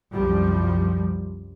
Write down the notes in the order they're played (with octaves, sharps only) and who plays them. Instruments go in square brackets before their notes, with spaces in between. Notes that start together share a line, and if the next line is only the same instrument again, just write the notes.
[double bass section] C2 F#2 F3 G3